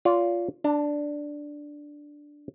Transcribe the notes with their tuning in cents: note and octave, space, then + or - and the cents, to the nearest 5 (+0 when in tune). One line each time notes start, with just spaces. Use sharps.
F4 +0 D5 -45
D4 +0 A5 +40